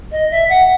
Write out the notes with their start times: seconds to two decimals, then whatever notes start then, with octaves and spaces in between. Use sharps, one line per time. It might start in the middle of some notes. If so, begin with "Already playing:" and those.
0.11 D#5
0.31 E5
0.49 F#5